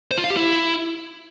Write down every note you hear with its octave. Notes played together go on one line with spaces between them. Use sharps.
C5
F4
F5
G4
E4